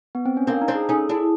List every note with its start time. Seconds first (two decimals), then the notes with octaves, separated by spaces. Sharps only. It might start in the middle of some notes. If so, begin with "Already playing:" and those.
0.15 B3
0.25 C4
0.37 C#4
0.47 A#3 C4 D4
0.61 D#4
0.68 C4 D4
0.75 G#4
0.89 C#4 D#4 A4
1.09 D4 E4 G#4